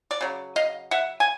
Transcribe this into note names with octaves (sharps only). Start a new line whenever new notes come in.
D5
C#3 F#3
D#5 F5
E5 F#5
G#5